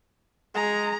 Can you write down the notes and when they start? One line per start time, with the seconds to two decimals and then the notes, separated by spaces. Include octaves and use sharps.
0.55 G#3 G#4 A#5